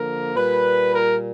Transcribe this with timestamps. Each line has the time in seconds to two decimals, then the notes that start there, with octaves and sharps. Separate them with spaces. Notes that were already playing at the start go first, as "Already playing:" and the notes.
Already playing: D3 F3 A#3 A#4
0.34 A#2 G3 A#3 B4
0.92 A#4